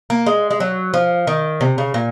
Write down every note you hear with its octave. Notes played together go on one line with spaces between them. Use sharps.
A#3
G#3
G#3
F#3
F3
D#3
C3
C#3
A#2